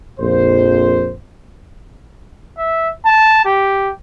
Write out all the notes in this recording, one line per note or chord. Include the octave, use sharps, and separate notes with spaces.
A#1 F2 C5
E5
A5
G4